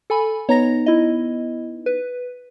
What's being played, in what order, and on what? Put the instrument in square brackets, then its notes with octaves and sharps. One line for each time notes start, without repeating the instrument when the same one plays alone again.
[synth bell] A4 G#5 B5
[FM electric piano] B3 D#4 [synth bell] C#5 A#5 A#6
[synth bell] E4 D#5
B4